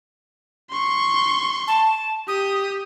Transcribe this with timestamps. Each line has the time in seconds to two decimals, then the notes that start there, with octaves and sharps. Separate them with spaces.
0.70 C6 C#6
1.67 A5
2.28 G4 D#6